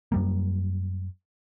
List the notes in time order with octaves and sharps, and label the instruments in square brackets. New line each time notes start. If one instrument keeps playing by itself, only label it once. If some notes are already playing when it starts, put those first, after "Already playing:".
[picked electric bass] F#2 G3 A#3